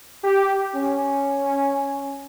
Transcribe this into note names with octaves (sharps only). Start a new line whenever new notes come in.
G4
C#4